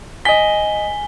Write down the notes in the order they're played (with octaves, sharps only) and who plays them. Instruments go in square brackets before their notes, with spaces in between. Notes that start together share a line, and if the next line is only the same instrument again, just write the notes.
[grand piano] D#5 B6 [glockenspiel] G#5 G7